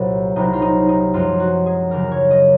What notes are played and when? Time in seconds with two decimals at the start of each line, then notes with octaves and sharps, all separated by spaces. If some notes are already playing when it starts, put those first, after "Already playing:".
Already playing: C2 A#2 F#3
0.36 C2 C3 F#3 D#4
0.53 F4
0.62 D#4
0.89 D#4
1.14 F#2 F3 G#3 F4
1.40 F#4
1.66 G#4
1.91 D#2 C#3 F#3 A#4
2.12 C#5
2.31 D#5